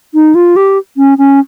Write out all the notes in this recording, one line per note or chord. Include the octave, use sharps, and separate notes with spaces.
D#4
F4
G4
C#4
C#4